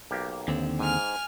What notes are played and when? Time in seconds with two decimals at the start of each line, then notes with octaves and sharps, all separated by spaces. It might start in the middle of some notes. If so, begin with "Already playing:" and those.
0.11 B1 A#3 G4
0.48 D#2 D3 C4
0.79 G#2 G#5 F6